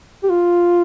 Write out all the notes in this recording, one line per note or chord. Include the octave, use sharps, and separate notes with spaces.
G4
F4